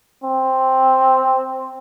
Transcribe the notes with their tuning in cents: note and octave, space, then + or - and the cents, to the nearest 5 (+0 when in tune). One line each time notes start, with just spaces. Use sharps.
C4 +5